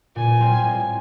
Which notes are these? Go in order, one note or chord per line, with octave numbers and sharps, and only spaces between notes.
A#2 G#5
G3 C4 F4
A2